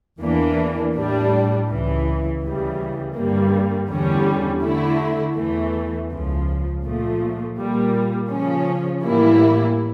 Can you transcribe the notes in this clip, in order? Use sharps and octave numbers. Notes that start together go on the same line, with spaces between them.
E2 E3 A#3 D4
A2 G3 D4
C#2 C#3 E3
D2 C#3 E3 G3
G2 D3 G3 A#3
E2 D3 G3 C#4
D3 A3 E4
E2 E3 A3
C#2 C#3 F3
A#2 F3 A3
A#2 G3 A#3
C#3 F3 C#4
A2 E3 G3 A#3 E4